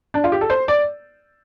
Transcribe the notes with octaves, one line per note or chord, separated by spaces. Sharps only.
D4
F4
G4
A4
C5
D5